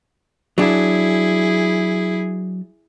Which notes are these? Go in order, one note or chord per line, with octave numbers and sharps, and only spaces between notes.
F#3 D4 E4 G#4